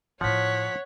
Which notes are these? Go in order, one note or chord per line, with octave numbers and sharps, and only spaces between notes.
A2 F3 E4 C#5 F#5 B6